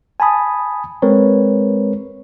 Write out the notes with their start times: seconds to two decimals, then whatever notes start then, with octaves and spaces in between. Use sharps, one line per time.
0.20 G#5 A5 B5 D#6
1.02 G#3 C4 A#4 B4 C#5